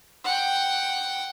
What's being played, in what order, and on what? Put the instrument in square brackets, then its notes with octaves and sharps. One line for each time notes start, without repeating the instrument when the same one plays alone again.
[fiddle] F#5 G5